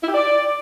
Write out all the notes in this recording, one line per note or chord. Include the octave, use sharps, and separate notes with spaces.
E4
G4
D5